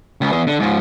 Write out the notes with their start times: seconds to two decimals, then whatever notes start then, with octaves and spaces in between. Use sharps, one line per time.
0.21 C#2
0.33 E2 G#4
0.47 D3
0.60 G#2 F3